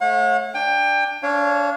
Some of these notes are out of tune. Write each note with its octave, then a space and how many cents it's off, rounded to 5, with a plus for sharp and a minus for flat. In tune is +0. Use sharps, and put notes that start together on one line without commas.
A3 -10 C#5 -35 F#5 -40
D4 +0 G5 +25
D4 -35 C#5 -5 F5 -25